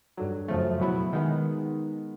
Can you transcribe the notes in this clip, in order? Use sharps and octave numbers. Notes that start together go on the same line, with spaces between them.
G2 D3 F#3
F#2 C#3 F3 A3
B2 F#3 B3 E4
D#3 G#3 B3